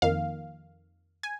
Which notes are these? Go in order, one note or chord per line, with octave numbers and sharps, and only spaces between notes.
F2 D#3 A#3 F5
G#5